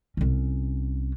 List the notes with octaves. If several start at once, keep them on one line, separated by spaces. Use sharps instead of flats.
C2 C#4